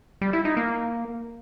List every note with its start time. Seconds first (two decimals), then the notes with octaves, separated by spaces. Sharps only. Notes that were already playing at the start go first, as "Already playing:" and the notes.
0.21 G3
0.33 E4
0.45 D#4
0.57 A#3